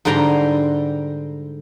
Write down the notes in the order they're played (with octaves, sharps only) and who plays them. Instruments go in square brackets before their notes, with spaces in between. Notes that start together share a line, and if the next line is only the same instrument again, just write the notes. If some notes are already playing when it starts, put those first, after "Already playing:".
[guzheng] G#2 D3 G3 G5 A#5 C6